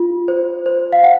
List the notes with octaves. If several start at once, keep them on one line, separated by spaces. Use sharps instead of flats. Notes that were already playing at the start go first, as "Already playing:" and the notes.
Already playing: F4
C5
C5
F5
F#5